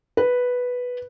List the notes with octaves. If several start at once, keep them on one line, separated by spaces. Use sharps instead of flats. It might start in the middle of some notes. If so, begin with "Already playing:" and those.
B4